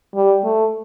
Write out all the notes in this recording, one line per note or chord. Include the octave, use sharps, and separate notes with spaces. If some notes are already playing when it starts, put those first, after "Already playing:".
G3
A3